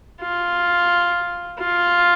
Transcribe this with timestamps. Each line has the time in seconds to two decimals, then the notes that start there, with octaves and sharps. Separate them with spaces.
0.22 F4
1.60 F4